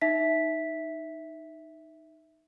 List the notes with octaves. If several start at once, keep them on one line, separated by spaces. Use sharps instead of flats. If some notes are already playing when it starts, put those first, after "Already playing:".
D#4 E5 B6